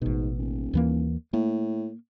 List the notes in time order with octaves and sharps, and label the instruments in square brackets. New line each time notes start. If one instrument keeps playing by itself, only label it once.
[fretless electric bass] A1 B2 [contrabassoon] G#2
[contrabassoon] D#1
[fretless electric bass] D#2 E3 A#3
[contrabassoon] A2 [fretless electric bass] A#3